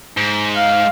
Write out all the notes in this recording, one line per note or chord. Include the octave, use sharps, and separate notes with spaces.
G#2
F5